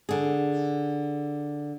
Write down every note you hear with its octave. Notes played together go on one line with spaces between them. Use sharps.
D3 G#4